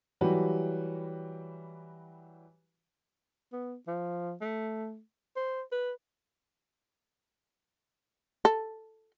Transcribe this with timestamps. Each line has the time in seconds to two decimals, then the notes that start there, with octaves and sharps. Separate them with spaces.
0.21 E3 F#3 G3 F#4 G4 B4
3.52 B3
3.87 F3
4.41 A3
5.36 C5
5.72 B4
8.45 A4